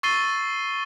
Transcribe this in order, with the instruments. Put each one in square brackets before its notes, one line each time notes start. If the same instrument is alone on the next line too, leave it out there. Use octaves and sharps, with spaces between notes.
[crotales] C#6 E6 A6 C7 D#7 G7